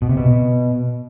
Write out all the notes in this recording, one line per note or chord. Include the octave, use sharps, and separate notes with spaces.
B2
C3
B2